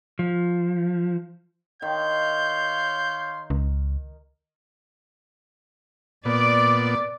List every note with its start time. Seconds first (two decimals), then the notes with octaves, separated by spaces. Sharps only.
0.19 F3
1.82 D#3 C#5 F5 C6 G6
3.50 C#2
6.25 A#2 B3 D5